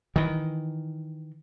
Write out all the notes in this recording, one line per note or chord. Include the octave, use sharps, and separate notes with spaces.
D#3 E3